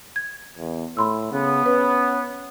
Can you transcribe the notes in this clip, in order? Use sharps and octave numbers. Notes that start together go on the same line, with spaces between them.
G#6
E2
A2 B5 C6 E6
C#3 B3
C#4 B4